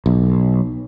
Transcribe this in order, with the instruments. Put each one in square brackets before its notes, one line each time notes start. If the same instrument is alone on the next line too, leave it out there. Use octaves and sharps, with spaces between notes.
[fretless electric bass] B1